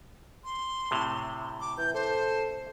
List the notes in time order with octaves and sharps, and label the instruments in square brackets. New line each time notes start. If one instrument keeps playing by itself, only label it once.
[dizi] C6
[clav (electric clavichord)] A2 C3
[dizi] D6
[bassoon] E3 [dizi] G6
[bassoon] A4 [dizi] C5